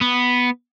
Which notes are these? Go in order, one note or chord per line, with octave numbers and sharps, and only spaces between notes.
B3